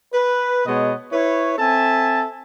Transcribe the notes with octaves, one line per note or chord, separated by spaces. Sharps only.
B4
B2 G#3 B3 C#5 D#5
E4 B4 C#5
C4 A4 E5 G#5 A5